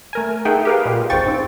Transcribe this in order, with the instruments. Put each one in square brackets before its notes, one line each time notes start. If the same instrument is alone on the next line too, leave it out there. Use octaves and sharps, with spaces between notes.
[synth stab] A3 A#4 G#5
A3 D#4 G#4 E5 F#5 G5
G4 G#4 A#4 B4 F5
A#2 G#3
G#1 E2 C5 G5 C#6 A6
C#2 G#2 C4